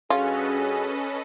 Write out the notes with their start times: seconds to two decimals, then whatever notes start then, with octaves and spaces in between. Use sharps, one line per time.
0.10 G2 C#4 F4 F#4 G#4 A4 B4 D#5